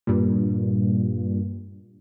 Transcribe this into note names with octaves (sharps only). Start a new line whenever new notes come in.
G2 A#2